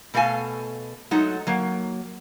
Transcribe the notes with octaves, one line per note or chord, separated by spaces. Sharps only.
B2 A3 A4 F5 G#5 A5
F#3 G#3 A3 D#4 F#5
F#3 A#3